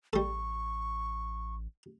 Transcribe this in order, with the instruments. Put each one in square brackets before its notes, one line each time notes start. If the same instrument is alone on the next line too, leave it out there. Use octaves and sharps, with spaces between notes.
[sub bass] A1 [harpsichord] G3 A4 [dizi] C#6